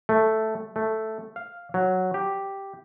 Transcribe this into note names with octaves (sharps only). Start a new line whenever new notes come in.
A3
A3
F5
F#3
G4